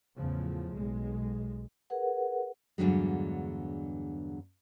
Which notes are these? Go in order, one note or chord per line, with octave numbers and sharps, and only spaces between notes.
E2 A2 C#3 F3
B1 G#3
G#4 A#4 B4 F#5
E2 G2 D3 F#3 G#3